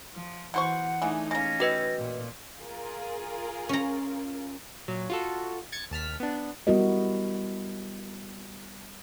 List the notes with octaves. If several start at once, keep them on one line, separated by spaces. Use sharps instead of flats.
F3
B2 E3 C5 F#5 C#6
E3 A3 D4 D#4 G#4
G#3 A#3 C#4 A#6
F#4 G4 B4 D#5
A#2
F4 G#4 A#4
C#4 A#5
A#2 F#3
F4 F#4 A4
G#6 A6 C#7
D#2 A5 F6 B6
B3 D4
G3 B3 E4 F#4 A#4 D#5